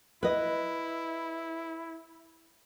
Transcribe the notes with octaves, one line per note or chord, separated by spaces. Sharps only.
E4 B4 D#5